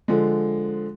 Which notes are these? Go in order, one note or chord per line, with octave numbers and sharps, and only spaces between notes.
D3 F3 G#3